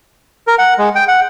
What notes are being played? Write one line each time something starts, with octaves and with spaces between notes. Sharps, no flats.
A#4
F#5
G#3
G5
F#5